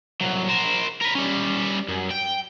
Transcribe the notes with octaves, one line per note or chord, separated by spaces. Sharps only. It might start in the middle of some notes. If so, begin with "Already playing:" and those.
C2 F#3
A#4 C5
A#4 B4
G3 C#4
F#2
G5